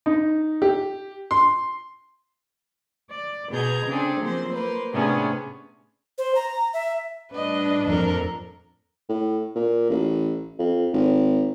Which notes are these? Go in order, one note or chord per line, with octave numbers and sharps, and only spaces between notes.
D#4
G4
C6
D5
B2 B3 G#4 A#5 G6 G#6
C#3 C4 D4 G#4 A4
F3 F#3 A#3 C4 C5
A#3 B4 C5
A2 C3 B3 C#4 D4 G#4
C5
A#5
E5
A2 G3 D4 B4 D#5
F2 A4 A#4
A2
A#2
A1
F2
G#1